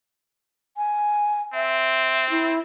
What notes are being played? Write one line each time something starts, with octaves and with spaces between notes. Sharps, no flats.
G#5
C4 E5
E4